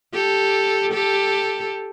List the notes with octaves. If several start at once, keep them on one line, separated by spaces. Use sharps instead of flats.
G4 A4
G4 A4